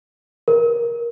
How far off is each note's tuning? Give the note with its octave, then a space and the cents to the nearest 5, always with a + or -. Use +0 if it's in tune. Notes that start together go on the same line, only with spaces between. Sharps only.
A#4 +15